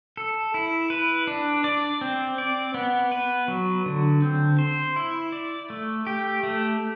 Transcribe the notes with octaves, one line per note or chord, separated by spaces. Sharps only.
A4
E4
B4
D4
D5
C4
D5
B3
B4
F#3
D3
C4
C5
E4
D5
A3
G4
A3